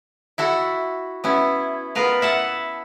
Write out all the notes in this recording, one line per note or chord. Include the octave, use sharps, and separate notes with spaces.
E4 F#4 A4
B3 C#4 E4
B3 F4 A#4 B4 F5
E4 E5 F#5 A5